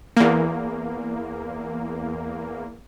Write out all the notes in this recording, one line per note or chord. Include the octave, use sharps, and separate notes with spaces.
E2 A#3